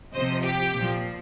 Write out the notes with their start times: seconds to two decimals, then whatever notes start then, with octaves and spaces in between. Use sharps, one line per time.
0.13 C3 F3 C5 D#5
0.43 G4
0.74 A#2 F3